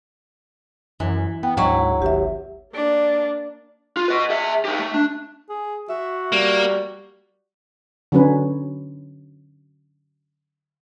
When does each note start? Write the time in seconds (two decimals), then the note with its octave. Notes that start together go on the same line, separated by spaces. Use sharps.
1.00 F#2 E3
1.43 B3 G5
1.57 D2 G#2 F#3 E4 C#6
2.02 G#1 G4 E5
2.74 A#3 D4
3.97 F4
4.08 B4 D#5
4.30 G#4 E5
4.65 D#4 G4
4.79 A3
4.94 D4
5.50 G#4
5.89 F#4 E5
6.32 G3 A#3
8.12 D3 F#3 C#4 B4